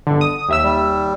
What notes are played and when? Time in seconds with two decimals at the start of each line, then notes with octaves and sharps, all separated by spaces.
0.07 G1 D3
0.21 D#6
0.48 D#2 E5 E6
0.64 G3